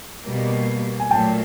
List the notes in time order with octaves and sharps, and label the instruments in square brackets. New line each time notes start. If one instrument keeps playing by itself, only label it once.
[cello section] B2 G3 A#3
[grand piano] G#5
[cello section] A#2 F#3 A3 [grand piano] G5 A5